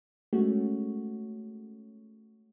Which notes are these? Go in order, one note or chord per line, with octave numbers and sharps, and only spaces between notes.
G#3 A3 C#4 F#4